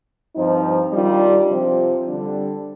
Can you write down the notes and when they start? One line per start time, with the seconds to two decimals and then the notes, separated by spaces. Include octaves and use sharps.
0.36 G2 F3 C4 D#4
0.93 D#3 G3 D4 F4
1.50 C3 F3 C4 F4
2.07 D3 G3 D4